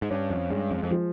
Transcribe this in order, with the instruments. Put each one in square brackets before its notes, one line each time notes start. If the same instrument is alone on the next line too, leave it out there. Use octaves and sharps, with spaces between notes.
[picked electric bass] G#2
[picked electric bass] G2 [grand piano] C#4
[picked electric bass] F2
[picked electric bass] G2 [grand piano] G#3
[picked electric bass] F2
F2
[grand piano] F3